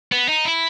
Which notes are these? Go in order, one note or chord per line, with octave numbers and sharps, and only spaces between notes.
B3
D#4
E4